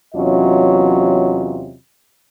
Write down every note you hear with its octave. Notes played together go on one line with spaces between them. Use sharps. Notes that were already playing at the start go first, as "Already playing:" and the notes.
E2 C3 F#3 C#4 F4 D#5